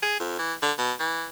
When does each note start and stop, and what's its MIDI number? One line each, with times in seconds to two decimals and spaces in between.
0.02 0.18 68
0.20 0.36 41
0.39 0.53 52
0.62 0.72 50
0.78 0.93 47
1.00 1.27 52